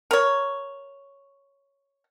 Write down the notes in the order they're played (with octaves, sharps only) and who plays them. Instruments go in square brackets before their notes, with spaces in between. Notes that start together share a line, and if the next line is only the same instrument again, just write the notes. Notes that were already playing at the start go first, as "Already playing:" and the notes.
[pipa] A#4 C#5